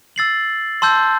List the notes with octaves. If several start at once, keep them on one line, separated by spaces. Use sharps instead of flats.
E6 A6 C7 F#7
A5 C6 E6 G6